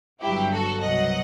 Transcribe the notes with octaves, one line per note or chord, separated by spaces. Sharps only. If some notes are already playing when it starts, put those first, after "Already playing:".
G1 G2 F#3 E4 G4
F#4 A4
C2 B2 F#3 D#5 F#5